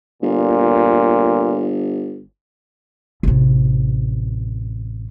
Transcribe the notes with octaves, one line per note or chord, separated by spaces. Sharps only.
G1 A#2
A1 C3